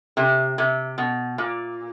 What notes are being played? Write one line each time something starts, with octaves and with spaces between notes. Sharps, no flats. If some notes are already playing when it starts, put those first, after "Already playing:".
C3
C3
B2
A#2